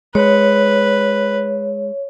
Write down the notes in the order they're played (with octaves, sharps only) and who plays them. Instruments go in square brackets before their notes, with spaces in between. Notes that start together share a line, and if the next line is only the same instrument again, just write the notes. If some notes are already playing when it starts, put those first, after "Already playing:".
[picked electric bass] G#3 [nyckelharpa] B4 [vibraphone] C#5